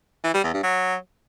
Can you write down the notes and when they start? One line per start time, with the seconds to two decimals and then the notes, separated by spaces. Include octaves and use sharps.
0.24 E3
0.34 G3
0.44 E2
0.54 G2
0.63 F#3